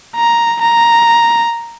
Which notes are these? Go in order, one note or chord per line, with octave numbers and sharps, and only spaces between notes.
A#5
A#5